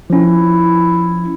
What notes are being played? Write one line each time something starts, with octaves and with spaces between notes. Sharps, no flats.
F3 C#4 E4